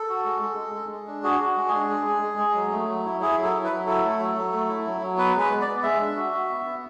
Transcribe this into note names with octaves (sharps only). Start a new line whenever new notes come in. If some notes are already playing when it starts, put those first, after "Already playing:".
Already playing: A4
F#4
G#3
G#3
G#3
G#3
G#3
D4
F#4 G#4
F#4
G#3
G#4
D4
G#3
G#3
G#3
G#3
F#3
A3
F#3
E4
E4 G#4
F#3
A4
E4
B4
F#3
E4 A4
A3
F#3
F#3
A3
E4
F#3
F#3
B3 B4
G#3 B4
B3
D5
B3
G#3 E5
D4
F#4
F#4
B3
B3